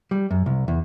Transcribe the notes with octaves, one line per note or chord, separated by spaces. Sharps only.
G3
F#2
C2
E2